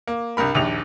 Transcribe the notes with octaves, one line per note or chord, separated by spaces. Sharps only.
A#3
C2 G2 A#4 B5
A#1 D#2 F7